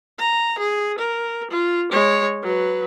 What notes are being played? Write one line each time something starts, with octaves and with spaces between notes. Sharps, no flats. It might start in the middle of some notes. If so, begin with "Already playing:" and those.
A#5
G#4
A#4
F4
G#3 C#5
F#3 B4